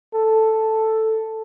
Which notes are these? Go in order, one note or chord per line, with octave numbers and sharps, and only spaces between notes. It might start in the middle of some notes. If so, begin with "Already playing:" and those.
A4